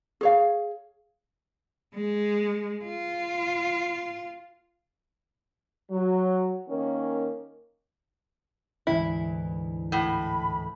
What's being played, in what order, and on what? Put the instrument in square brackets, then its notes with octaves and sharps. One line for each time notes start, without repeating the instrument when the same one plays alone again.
[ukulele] G#4 C#5 F5
[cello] G#3
F4
[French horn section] F#3
D#3 A#3 C#4
[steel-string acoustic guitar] D2 G#2 E3 [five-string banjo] E4
[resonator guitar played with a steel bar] A2 [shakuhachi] B5